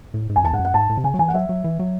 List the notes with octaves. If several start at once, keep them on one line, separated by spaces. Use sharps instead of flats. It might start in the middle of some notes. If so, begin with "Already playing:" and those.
A2
G#2
F#2 G#5
E2 A5
G#2 F#5
F#2
F#5
G#2 A5
A2
C3
C#3 G#5
F#3
E3 G#5
F#5
F#3 E5
F#3
E3
F#3